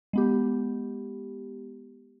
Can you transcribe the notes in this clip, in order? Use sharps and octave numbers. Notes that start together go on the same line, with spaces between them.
G#3 B3 G4